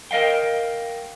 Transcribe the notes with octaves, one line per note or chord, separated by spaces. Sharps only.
A#4 D#5 F5 G5